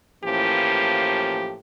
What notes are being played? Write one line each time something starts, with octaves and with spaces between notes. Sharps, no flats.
A2 E3 F3 A#3 C#4 G4